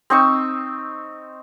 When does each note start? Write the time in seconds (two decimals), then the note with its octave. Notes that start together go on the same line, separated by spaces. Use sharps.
0.10 C4 D#4 C#6 E6